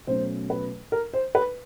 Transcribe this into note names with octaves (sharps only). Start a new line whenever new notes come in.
B2 F#3 A3 C#4 C5
B4
A#4
C5
B4